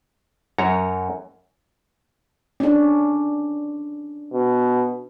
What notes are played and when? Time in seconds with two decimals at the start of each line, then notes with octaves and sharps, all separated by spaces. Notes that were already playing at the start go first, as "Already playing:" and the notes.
0.58 F#2 C#5 A#5
2.60 C#4 D4
4.33 B2